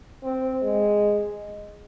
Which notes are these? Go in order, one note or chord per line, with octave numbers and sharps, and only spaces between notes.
C4
G#3